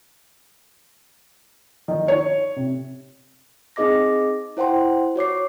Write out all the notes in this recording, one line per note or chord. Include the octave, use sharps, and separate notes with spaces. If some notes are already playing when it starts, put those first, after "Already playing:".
D#3
C#5
C3
C4 D#4 G#4 D#5 D6 A#6
E4 C5 F#5 G5 C6
F#4 C#5 D6 C7